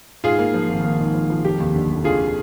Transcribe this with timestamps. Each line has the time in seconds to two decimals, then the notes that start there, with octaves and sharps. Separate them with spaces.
0.24 G#2 F4 G#4
0.39 A#3
0.54 F3
0.69 G#1
0.84 A#3
1.00 G#2
1.14 F3
1.30 F3
1.45 F1 G4
1.60 D#2
1.75 D3
1.90 F1
2.05 D3 F4 G#4